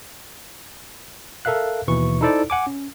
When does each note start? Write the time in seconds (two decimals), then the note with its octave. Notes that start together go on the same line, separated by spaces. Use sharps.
1.45 A4 A#4 E5 F5 F#6
1.87 D#2 B2 E3 C#6
2.21 D#4 E4 A4 C5 D5
2.50 F#5 G#5 D6
2.67 C#4